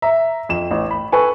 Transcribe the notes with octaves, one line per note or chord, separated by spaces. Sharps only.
E5 A#5
F2 E7
A1
B5
A4 B4 G#5 C#6